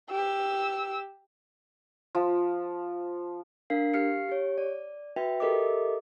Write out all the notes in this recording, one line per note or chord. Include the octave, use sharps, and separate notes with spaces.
G4 E6
F3
D4 A#4 F5 C7
G4 F5 F6 C7 C#7
G4 C#5
D5
F#4 B4 E5 G5
G4 A4 A#4 D#5 E5 D6